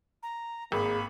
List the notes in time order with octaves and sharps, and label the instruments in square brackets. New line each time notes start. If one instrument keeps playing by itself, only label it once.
[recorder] A#5
[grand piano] G#1 [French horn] A#3 [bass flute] G#4 [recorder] B5